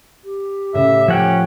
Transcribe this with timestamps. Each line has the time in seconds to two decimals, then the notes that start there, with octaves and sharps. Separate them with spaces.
0.24 G4
0.74 A2 C#3 E5 A#6
1.08 F3 C#4 F#5 G5 D7